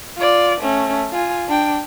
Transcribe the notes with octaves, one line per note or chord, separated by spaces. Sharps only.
F4 D5
A3 C#4
F4 G#5
D4 G5